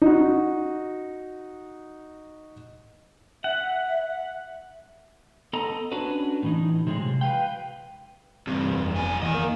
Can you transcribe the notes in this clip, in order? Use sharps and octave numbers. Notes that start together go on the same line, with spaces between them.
D#4 F#4
E5 F#5
B3 A4 D#5 A#5
C#4 D4 F#4 B4
A2 E3 D#4
C3 F#3 G#3 G#4
B4 F5 G5
E2 G2 C3
F1
B2 G#5
E2 D#3 D#5
A#3